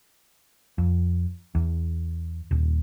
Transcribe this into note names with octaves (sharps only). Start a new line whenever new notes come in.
F2
E2
D#1